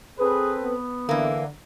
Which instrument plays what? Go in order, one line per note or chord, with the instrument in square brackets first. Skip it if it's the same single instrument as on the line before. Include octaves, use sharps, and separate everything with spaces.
[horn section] C4 A4 B4 [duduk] G#4
[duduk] B3
[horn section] D3 [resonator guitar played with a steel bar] E3 A#3